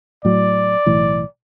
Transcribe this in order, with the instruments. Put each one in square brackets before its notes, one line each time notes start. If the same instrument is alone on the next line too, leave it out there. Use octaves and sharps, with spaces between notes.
[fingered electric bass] A2 F#3 [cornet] D5
[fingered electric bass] B1 A2 E3